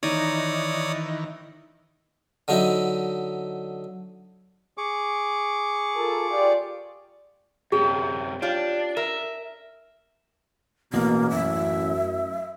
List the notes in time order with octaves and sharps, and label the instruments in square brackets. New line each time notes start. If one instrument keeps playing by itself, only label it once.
[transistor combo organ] D#3 E3 [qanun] D#4 [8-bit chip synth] C#5 D5 D#6
[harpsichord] D3 F#3 D#4 E4
[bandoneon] G#4 C#6 D6
[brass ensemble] F4 A4 A#4
F4 G4 D5
[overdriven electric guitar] F#2 C3 [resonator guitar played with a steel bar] G4 [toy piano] G#4
[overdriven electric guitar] D4 [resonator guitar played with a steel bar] F4 G4 [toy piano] C#5
[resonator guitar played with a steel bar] A#4 [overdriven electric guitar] E5
[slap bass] A1 E2 [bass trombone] B2 [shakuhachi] A#3
[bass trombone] F#2 [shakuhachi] E5